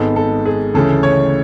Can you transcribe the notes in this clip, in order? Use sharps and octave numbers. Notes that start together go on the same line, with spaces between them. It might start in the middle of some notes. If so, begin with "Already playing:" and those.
Already playing: G#1 G#2 G#3 B3 A4
A4
G#4
D2 C#3 E3 A3 A4
C#5